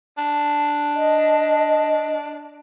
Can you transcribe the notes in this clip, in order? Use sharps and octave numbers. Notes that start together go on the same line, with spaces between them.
D4
D#5